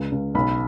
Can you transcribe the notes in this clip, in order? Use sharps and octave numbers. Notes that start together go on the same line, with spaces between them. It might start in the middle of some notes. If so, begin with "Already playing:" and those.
Already playing: C#2
C#2
B1 B5